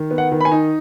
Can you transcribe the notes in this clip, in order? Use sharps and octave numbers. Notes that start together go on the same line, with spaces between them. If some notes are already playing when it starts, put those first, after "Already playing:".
Already playing: D#3
B3
F#5
D#3
B5
G#5
D#4